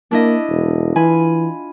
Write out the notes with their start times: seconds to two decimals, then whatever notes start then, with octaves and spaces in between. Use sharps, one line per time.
0.11 A#3 D4 E4 D#5
0.49 E1
0.96 E3 F4 G#5 B5